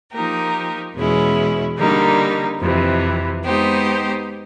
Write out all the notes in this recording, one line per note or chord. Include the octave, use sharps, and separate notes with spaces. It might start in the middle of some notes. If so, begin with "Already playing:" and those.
F3 A#3 D#4 G4 A#4
E2 B2 G#3 C#4 E4
D3 G3 A#3 D#4
F2 C3 E3
G#3 B3 D#4 G4 C5